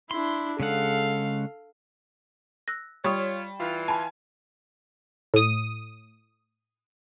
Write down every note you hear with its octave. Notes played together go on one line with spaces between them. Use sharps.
D4 E4 C6
C#3 G#3 A4 F5 F#5
E6 F#6 A#6
G3 F4 C#5 C#6 D#6
E3 F4
G#5 A5 B5
A2 D#6